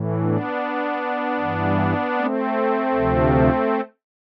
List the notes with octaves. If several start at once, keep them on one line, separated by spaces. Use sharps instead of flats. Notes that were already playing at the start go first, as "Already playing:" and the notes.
Already playing: A2 E3
B3 D4
G2 E3
A3 C4
D2 C3 F3